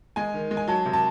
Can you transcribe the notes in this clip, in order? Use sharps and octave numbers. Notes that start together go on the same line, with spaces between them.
G#3 G#5
D#3
G#3
G#5
F#3 A5
C3
A5